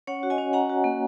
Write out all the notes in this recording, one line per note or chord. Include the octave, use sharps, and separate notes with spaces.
C#4 C#5 F#5
F#4
D#5 G#5
C#4
C#4 F#5 A#5
F#4
A#3